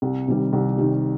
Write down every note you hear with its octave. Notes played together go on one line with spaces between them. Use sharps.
C2
C3 D#3 G3
C2
C3 D#3 G3